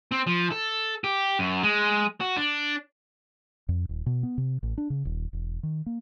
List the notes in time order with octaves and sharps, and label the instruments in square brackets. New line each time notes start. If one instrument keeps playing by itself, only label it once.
[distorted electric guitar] C4
F3
A4
G4
F#2
G#3
F#4
D4
[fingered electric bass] F2
D#1
B2
B3
C3
A1
D4
C#3
D#1
E1
D#3
A#3